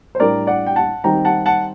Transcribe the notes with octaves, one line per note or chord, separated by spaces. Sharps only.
C5
A2 G3 D4 A#4 D5
D5 F#5
G5
F#5 A5
D#3 G3 C4 D#4 G5 A#5
F#5 A5
F#5 A5